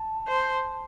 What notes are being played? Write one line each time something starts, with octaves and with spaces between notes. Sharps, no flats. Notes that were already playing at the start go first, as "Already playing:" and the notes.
Already playing: A5
C5